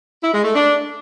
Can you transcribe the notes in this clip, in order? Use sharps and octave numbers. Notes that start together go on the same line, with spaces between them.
E4
G#3
A3
D4